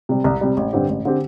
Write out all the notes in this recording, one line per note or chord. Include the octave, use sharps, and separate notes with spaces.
C3 G3
C2
C3 G3
A1
G2 D3 C4 G4
A1
D3 C4 G4